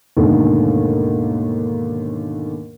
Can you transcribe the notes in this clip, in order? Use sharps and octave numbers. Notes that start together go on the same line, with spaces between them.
D#2 G#2 B2 D3 A3 A#3